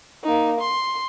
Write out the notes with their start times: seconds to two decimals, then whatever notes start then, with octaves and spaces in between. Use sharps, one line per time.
0.24 A#3 D#4
0.60 C6